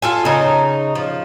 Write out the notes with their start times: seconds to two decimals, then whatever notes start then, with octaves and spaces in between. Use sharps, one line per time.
0.02 F4 A4 G#5
0.25 C#3 D#4
0.95 F3